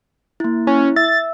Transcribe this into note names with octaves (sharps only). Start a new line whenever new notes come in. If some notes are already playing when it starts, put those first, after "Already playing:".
A#3 E4
C#4 E4
E5 E6 A6